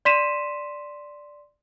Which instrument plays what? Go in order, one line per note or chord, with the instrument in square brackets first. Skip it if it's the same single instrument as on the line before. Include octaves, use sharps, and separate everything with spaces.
[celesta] D5 C6 B6 D#7 E7